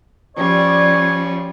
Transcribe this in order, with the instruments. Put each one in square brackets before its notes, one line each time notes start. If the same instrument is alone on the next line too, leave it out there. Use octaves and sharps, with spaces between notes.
[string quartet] F3 G3 C#4 [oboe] C#5 [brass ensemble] D5